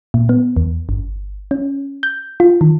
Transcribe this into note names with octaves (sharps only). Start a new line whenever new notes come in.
A#2
B3
E2
G1
C#4
G6
F4
D#3